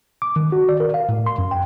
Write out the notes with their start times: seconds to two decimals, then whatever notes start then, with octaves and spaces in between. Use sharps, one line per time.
0.22 D6
0.36 D#3
0.52 F#4
0.69 D5
0.80 A#4
0.94 F5
1.09 A2
1.26 C6
1.38 F#2
1.51 G5